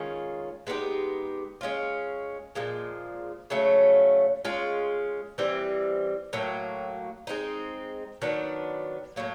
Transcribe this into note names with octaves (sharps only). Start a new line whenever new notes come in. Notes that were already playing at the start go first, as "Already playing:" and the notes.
Already playing: D#3 G#3 C#4 F4
G#3 B3 D#4 G4
G#3 C#4 F4
A#2 F3 G#3
C#3 F#3 A3 C#4
G#3 C#4 F4
E3 G3 C4
A2 F#3 A#3
G#3 C4 D#4
D#3 F#3 B3 D4
A2 F#3 A#3